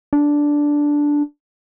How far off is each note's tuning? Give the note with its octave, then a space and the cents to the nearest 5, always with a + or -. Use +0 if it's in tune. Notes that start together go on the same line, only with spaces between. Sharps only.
D4 -5